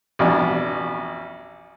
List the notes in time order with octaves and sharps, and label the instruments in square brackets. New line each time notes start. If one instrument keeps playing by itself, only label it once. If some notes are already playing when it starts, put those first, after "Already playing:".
[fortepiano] A1 F2 B2 D4